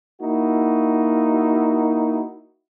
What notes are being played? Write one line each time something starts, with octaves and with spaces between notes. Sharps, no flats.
A#3 D#4 E4 F#4